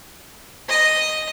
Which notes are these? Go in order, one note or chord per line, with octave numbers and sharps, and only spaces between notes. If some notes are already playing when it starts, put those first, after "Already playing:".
D#5